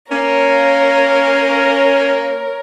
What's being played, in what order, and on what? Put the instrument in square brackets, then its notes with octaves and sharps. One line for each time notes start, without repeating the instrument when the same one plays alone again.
[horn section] A#3 C#4 [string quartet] A#4 C#5